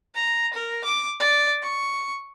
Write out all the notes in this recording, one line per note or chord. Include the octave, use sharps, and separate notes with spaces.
A#5
A#4
D6
D5
C#6